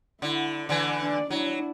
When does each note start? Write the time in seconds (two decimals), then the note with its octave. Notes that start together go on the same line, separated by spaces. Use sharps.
0.22 D3 E4
0.69 D3 E3 D5 G#5
1.01 D4 D5
1.30 F#3 D4 E4